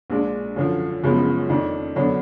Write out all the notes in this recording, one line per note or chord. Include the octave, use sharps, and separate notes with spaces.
A#1 A#2 G#3 D4
F#2 D3 F3
F#1 F#2 F3 G#3 B3
F2 D#3 A#3 D4
F#2 D3 F#3 B3 D4